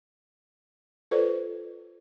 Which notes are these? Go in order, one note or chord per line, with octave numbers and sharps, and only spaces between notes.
F4 A4 B4 C5 D5